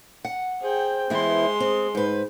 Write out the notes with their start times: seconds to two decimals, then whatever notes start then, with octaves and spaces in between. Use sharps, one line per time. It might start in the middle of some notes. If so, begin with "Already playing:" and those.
0.25 F#5
0.62 G#4 C5 G5
1.10 E3 G#3 B3 E4 C6
1.60 C4 G#4
1.95 G#2 B4 C5